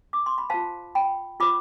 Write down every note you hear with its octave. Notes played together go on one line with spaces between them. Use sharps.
D6
C6
B5
F4 C5 F5 A5
G5 B5
F4 C5 B5 D6